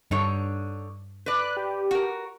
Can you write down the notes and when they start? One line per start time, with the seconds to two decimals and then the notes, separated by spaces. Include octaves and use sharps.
0.11 G2 D3 D#4 C#5
1.26 B4 D5 F#6
1.57 G4
1.91 F#4 A#4